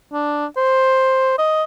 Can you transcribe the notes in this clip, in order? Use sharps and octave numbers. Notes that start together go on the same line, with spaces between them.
D4
C5
D#5